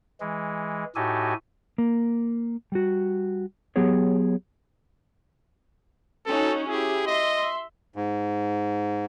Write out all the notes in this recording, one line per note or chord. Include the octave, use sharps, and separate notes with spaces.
E3 G#3
A2 D#4 F#4 G4 A4 G#5
A#3
G3 F#4
F#3 B3 G4 G#4 C#5
C#4 D#4 F#4 A4
E4 G4 G#4
D#5 E5 C6
G#2